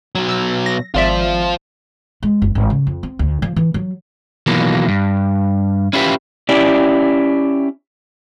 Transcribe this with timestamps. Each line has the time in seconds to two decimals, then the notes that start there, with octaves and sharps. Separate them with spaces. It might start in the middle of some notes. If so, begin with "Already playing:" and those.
0.15 B2 F#3
0.29 E6
0.66 A#6
0.94 G#1 F4 C5 D5 E5
2.23 G#3
2.42 F#1
2.55 G#1
2.70 C#3
2.87 F2
3.03 C4
3.19 D2
3.42 F3
3.56 E3
3.74 F#3
4.47 B2 D#3 E3 F#3 A#3 F4
4.88 G2
5.93 C#4 E4 F4 G4 A4 B4
6.49 C#4 E4 G4 D5